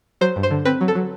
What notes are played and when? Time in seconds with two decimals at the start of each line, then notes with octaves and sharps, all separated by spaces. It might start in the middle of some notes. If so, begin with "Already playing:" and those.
0.21 F#3 C5
0.36 G2
0.43 C5
0.51 D3
0.65 C4 B4
0.81 F#3
0.88 A4
0.95 F#3